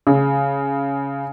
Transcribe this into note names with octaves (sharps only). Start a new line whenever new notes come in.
C#3